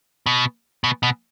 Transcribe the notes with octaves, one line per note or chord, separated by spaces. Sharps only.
B2
B2
B2